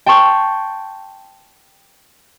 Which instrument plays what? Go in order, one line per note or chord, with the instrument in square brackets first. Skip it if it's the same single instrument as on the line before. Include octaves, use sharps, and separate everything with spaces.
[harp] G5 A5 C6 C#6 G6